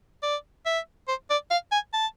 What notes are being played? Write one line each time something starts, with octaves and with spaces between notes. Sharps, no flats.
D5
E5
C5
D5
F5
G#5
A5